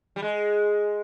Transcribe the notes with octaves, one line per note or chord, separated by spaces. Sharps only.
G3
G#3